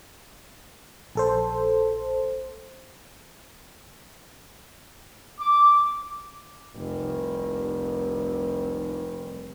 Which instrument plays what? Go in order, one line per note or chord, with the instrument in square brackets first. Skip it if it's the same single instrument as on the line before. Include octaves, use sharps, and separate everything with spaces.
[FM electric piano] A#1 A4 C5
[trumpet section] D6
[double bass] F1 C2